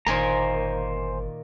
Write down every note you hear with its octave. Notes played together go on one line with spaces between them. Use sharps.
G1 A#2 D#3 A#3 C5 G#5 A#5